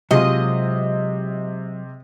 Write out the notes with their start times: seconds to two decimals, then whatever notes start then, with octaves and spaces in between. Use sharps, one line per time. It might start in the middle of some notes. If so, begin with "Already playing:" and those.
0.11 C3 F#3 G#3 F4 D#5